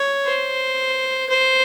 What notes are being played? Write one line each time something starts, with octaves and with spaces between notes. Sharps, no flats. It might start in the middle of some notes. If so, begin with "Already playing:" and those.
Already playing: C#5
C5
C5